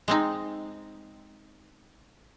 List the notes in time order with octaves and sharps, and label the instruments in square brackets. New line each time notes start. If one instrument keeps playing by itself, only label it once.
[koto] G#3 C4 D#4